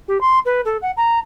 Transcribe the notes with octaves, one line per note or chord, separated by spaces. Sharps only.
G4
C6
B4
A4
F#5
A#5